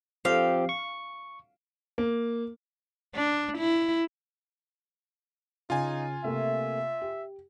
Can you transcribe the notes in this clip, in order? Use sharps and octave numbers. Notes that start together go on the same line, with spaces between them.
F3 C4 G4 F5
C#6
A#3
D4
E4
C#3 D#4 F4 G#5
C3 A3 A#3 E5
G4